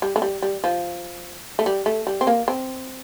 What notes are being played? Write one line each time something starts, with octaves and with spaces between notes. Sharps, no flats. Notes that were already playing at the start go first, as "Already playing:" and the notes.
G3
A3
G3
G3
F3
A3
G3
A3
G3
C4
A#3
C4